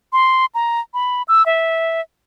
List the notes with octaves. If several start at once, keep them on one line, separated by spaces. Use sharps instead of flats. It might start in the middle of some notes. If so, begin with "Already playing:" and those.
C6
A#5
B5
E6
E5